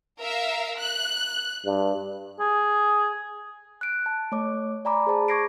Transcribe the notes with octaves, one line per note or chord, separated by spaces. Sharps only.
A#4 E5 F5
F#6
G2
G#4
F#6 D7
A5
A3 C#5 D6
D5 G#5 A#5 B5 D6
G#4 C5 A5
C#6 D6 G#6 A#6 C7 D7